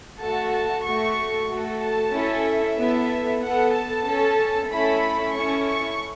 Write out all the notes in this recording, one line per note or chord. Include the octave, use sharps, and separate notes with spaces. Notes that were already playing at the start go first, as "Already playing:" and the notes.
A3 F#4 A4 A5
A5
A3 F#4 A4 C#6
A3 F#4 A4
A5
C#4 E4 A4
E5
B3 E4 A4
B3 A4 F#5
A5
C#4 A4
A3 C#4 E4 A4 B5
C#4 E4 A4 C#6
C#6